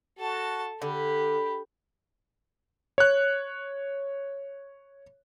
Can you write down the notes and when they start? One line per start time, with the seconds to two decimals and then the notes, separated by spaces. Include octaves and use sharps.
0.19 F#4 A4 A5
0.82 D3 G4 B5
2.98 C#5 F#6